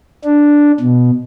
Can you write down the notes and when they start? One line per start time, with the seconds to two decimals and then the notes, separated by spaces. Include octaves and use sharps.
0.24 D4
0.80 B2